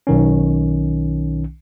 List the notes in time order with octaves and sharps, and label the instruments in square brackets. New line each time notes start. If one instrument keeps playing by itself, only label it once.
[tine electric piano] B1 D#3 C#4